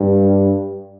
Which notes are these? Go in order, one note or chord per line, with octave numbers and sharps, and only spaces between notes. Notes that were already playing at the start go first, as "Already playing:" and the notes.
Already playing: G2